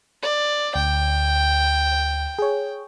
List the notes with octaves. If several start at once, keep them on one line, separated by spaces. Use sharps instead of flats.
D5
D2 G5
G#4 C#5